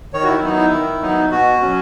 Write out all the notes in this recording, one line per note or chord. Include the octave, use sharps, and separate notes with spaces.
D#3 C#5
F#4
E4
F#3 B3 D#4
E4
D#3
F#3 B3 D#4
B2 F#4
F#3 C#4